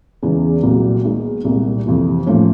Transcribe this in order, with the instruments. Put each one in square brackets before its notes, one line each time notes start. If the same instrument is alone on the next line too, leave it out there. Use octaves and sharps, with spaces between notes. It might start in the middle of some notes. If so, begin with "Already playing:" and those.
[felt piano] E2 C#3 E3 G#3
C2 A#2 F#3
D#3 G#3 B3
C2 A#2 G3
F2 C3 E3
A2 F3 A#3 C#4